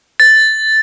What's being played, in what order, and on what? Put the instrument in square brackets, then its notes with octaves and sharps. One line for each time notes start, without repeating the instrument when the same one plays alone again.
[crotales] A6